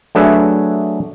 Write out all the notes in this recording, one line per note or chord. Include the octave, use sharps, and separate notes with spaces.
F#3 A3 D4 G#4 B4 E5